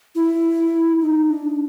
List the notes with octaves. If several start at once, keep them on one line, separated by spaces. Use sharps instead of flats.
E4
D#4
D4